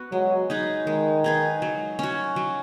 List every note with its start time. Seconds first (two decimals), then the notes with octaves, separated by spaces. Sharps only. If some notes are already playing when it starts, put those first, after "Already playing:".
Already playing: B3 F#4 B4
0.12 F#3 G#3
0.50 D#4 G#4 B4
0.87 D#3 G#3
1.24 D#4 G#4 B4
1.62 F#3
1.99 C#4 F#4
2.36 F#3